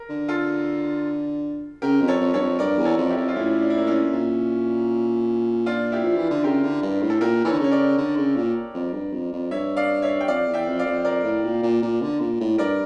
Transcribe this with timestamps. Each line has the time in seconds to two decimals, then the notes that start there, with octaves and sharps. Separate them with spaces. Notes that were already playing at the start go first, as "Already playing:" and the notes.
Already playing: A#4
0.09 D3
0.28 F4 A4
1.82 C#3 G4 A#4
2.02 F2
2.08 A4 C#5
2.20 F2
2.34 G2 A4 C#5
2.41 F2
2.59 G2 A#4 D5
2.78 E2
2.85 A4 C#5
2.98 F2
3.10 E4 G4
3.17 F2
3.28 F4
3.36 A2 C#4 E4
3.62 D4
3.70 E4
3.78 A#3 D4
3.87 C#4 E4
4.13 A#2
5.66 D4 F4
5.92 E4 G4
6.04 F3
6.17 E3
6.30 D3
6.44 C#3 G4 A#4
6.63 D3
6.82 G2
7.02 A2
7.10 A4
7.21 A#2 G4 A#4
7.44 E3 A4 C#5
7.52 D3
7.59 C#3
7.64 C#5
7.71 A#4 D5
7.98 D3
8.16 C#3
8.36 A#2
8.75 F2
8.93 G2
9.13 F2
9.33 F2
9.51 G2 C#5 E5
9.77 D5 F5
10.02 C#5 E5
10.21 G5
10.28 F2 D5 F5
10.47 E2
10.53 E5 G5
10.67 F2
10.79 D5 F5
10.86 F2
11.05 F2 A#4 D5
11.24 A2
11.44 A#2
11.63 A#2
11.82 A#2
12.02 D3
12.20 A#2
12.40 A2
12.58 G2 A#4 D5